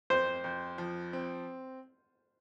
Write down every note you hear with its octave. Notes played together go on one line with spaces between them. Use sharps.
F2 C5
F2
F3
C4